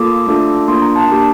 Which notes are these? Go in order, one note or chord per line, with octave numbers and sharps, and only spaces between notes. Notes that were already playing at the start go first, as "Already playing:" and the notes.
Already playing: A#3 F4 A4 D6
A3 D4 F4 A4
A#3 D4 F4 C6
A#5
A5
A#3 D4 G4